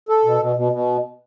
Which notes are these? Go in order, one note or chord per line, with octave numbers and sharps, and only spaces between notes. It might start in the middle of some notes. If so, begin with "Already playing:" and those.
A4
B2
B2
B2
B2